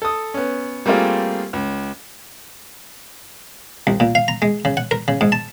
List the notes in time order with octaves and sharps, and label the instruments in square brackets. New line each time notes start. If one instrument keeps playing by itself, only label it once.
[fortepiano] A4 D#6
B3 C#4
G3 A3 A#3 C4 F4 G#4
C#2
[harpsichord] C2
A#2
F5
A#5
G#3
C#3
F#5
A#4
C#3
G#2
A5